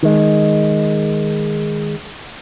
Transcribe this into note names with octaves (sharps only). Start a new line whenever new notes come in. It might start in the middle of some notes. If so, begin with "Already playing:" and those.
D#3 G#3